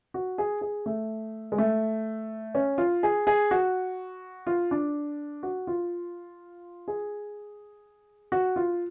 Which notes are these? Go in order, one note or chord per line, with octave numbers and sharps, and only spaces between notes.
F#4
G#4
G#4
A3
G#3
A3
C#4
F4
G#4
G#4
F#4
F4
D4
F#4
F4
G#4
F#4
F4